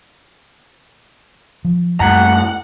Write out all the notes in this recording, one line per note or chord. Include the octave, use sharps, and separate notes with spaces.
F3
C2 F#2 A2 G3 A#3 F#5 A#5